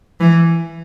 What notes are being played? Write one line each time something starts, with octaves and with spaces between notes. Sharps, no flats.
E3